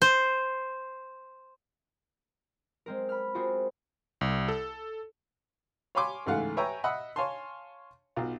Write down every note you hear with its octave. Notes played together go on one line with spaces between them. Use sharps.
C5
G#3 C4 A#4
B5 F6
C4 F4 F#4 G#4 A#4
C2
A4
C#5 F5 G#5 B5 C6 D6
C#2 G#2 E3 A3 F5 F#5
B4 C#5 E5 G5 G#5 A#5
D#5 E5 F#5 B5
C#5 F5 G#5 A5 C6
B1 F4